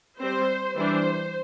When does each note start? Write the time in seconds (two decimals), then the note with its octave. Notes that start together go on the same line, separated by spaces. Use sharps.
0.20 G3 C4 C5
0.75 E3 G3 D4 C5